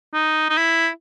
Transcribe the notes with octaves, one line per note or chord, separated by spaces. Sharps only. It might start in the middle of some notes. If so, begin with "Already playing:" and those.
D#4
D#4
E4